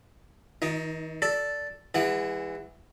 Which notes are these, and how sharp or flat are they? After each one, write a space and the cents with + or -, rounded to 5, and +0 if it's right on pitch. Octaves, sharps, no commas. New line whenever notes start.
D#3 +45 D#4 +5
A4 +0 D5 -10 A5 +0
E3 +0 G#3 -35 F#5 +0